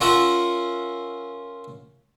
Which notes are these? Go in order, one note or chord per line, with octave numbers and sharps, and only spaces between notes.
C#4 F4 A#4 E5 F#5